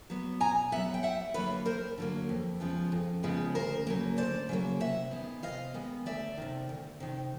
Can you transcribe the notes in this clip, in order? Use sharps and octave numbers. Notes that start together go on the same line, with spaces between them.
F#3 B3
B2 G#5 A#5
F#3 B3 E5 F#5
G5
D#2 E5 F#5
D3 F#3 A#3 B4 C#5
D#2 A#4 C5
D3 F#3 A#3
F2
C#3 F3 G#3 B3
F2
C#3 F3 G#3 B3
D2 A#4 C5
C#3 F#3 A#3
D2 C5 D5
C#3 F#3 A#3
C3 E5 F#5
D#3 G#3 B3
C3 D#5 F5
D#3 G#3 B3
D2 D5 E5
C3 D#3
D2
C3 D#3